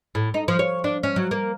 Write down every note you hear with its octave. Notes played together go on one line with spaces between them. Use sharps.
A2
D#4
F3
C#5
D4
C#4
F#3
A#3